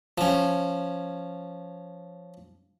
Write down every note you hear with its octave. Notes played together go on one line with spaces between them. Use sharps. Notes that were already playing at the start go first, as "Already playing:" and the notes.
F3 C#4